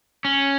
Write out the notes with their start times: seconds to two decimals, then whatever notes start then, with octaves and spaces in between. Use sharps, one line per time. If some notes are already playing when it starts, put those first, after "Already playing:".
0.25 C#4